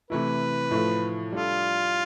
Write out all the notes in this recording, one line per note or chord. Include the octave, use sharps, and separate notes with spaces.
C3 E3 A3 E4 B4
A2 F3 A3
G3 D4 F4 A4